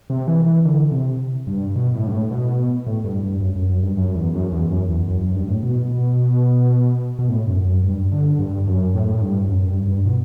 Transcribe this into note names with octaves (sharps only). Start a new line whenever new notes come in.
C3
E3
E3
D3
C3
G2
B2
A2
G2
A2
B2
A2
G2
G2
F#2
F#2
F#2
G2
F#2
F#2
E2
F#2
E2
F#2
E2
F#2
F#2
G2
A2
B2
B2
B2
A2
F#2
F#2
G2
D3
G2
F#2
A2
A2
G2
F#2
F#2
G2
G2
B2